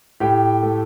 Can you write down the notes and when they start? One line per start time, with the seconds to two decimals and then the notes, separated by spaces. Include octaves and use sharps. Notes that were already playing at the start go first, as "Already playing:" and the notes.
0.20 A2 G4 G5
0.62 A3